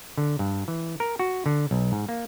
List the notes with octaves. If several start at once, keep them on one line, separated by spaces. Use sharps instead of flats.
D3
G2
E3
A#4
F#4
D3
B1
G#2
A#3